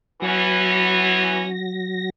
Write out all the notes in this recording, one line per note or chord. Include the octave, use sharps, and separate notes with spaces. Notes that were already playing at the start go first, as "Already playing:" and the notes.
E3 F#3 B3 C#4 A#6